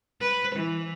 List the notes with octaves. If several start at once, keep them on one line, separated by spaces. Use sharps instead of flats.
B4
E3